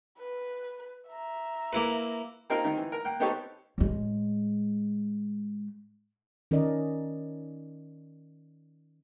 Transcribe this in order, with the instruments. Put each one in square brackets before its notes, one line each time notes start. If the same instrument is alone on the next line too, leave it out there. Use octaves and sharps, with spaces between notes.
[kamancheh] B4
E5 A#5
[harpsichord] A#3 E4 B4
[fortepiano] A#3 C4 D#4 F4 A#4
D#3 C4 D#4
E3
A#4
A#3 F#5 G5
B3 C4 D#4 G4 A4 C#5
[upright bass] A2 G#3
[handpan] D#3 C#4 A#4 D5 D#5